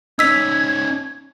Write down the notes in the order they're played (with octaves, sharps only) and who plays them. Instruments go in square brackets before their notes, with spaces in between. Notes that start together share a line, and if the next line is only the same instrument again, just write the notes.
[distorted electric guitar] C#4 D#4 [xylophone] E6 B6 [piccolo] G#6